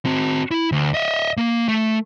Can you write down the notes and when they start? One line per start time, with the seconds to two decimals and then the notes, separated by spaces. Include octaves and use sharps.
0.05 C4 F#4
0.51 E4
0.72 D2
0.94 D#5 E5
1.37 A#3
1.68 A3